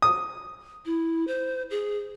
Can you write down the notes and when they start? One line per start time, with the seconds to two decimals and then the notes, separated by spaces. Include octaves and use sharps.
0.02 D#6
0.86 E4
1.27 C5
1.71 G#4